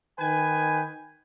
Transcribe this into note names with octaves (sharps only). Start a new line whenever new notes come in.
D#3 B4 G5 G#5